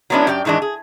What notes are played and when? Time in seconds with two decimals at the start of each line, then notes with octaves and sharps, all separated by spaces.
0.10 F#3 G#3 B3 C#4 D4 E4
0.27 F#2 G4 D5 G5
0.45 G#2 D#3 E3 G#3 D4
0.62 G#4